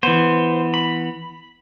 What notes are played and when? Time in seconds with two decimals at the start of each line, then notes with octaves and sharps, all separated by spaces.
0.03 E3 B3 C5
0.74 B5